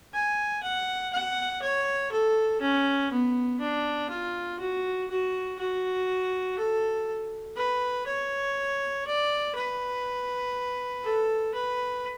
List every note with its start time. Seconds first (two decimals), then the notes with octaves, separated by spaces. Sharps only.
0.13 G#5
0.63 F#5
1.13 F#5
1.62 C#5
2.12 A4
2.61 C#4
3.11 B3
3.60 D4
4.09 F4
4.59 F#4
5.10 F#4
5.59 F#4
6.58 A4
7.57 B4
8.06 C#5
9.07 D5
9.55 B4
11.04 A4
11.54 B4